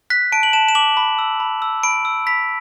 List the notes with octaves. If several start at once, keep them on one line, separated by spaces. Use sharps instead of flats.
F#6 B6
A5 D7
F#7
A5 E7
E7
D6 F#7
B5
E6
B5
E6
B5 D7
E6
B5 B6